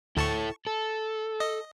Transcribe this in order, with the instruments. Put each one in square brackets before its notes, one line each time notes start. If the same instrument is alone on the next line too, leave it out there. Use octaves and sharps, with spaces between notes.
[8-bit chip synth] D2 A5 C#6 [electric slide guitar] E4 A4
[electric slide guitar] A4
[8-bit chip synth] D#5